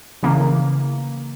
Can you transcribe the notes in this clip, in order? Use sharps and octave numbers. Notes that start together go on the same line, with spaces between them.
C#3 E3 A#3